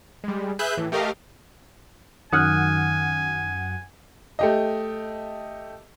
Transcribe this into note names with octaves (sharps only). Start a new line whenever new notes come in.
G3 G#3
G#4 B4 E5 F#6 G6
A2 E3
A3 G4 A#4 D#5 F5
F#2 D#3 F#5 G#5 D#6 F6 F#6
A3 G4 D#5